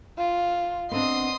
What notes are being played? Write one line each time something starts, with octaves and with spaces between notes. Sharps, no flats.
F4
B3 C4 D4 D#5 C6 D#6